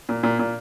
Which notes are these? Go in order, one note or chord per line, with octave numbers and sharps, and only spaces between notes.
A#2
A#2
A#2